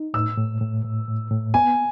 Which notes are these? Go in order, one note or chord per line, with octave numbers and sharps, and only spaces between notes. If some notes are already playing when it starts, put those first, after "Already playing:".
Already playing: D#4
A2 E6
A2
A2
A2
A2
A2
B3 G#5